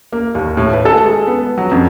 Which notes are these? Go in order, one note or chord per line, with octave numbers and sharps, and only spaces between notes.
A#3
D#2
A2
B4
A4
G#3
B3
F#3
F2